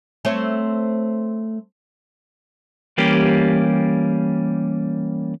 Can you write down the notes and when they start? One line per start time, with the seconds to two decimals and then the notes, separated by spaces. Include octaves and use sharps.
0.25 A3 C4 C#5
2.98 E3 G3 A#3 C#4 G4